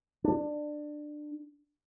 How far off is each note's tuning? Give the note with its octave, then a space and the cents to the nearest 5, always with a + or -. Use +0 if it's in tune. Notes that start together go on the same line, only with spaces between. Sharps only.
D4 +20